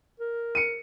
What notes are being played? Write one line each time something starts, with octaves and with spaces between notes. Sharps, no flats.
A#4
C#7 D#7